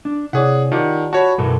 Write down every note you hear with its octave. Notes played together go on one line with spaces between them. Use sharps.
D4
C3 E4 G#4 C#5 D5 F#5
D#3 F4 G4 D5 F#5 A5
F#4 C#5 F#5 A5 B5
F#2 B2 E3 A4 A#4